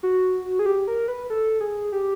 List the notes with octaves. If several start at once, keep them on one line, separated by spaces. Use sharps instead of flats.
F#4
G#4
G4
A#4
B4
A4
G#4
G4